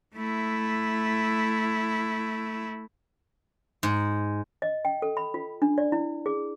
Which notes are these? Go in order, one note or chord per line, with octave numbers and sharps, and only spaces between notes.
A3 E4
G#2
D#5
G5
A4
B5
F4
D4
D5
E4
G#4